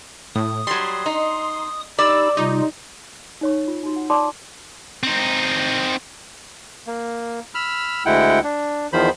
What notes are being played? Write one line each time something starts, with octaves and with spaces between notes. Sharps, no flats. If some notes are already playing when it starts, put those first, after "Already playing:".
A2 D#6
F#3 G3 C6
D#4
D#4 G4 D5 B5 E6
C3 G3 D#4 F4
D#4 C#5 C#6
F4
D#4 F#4
F#5
D5 A5 B5 C6 D6 D#6
C4 D#4
A#3
B5 E6 F6
D2 G#3 E4 F#5 G5
D4
E2 D#3 F3 C5 B5